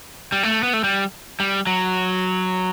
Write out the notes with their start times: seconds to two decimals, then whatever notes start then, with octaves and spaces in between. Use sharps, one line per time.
0.32 G3
0.43 A3
0.63 B3
0.73 A3
0.84 G3
1.40 G3
1.67 F#3